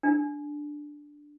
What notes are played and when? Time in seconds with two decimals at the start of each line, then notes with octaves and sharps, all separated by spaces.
0.03 D4